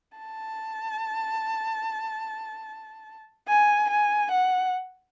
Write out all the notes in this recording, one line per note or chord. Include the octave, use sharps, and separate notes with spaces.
A5
G#5
G#5
F#5